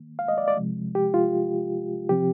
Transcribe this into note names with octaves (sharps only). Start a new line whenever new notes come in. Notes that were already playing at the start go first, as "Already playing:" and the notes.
Already playing: D#3 A#3
F5
D#5
D5
D5
C3 F3 G#3
G4
F4
C3 F3 C4 G4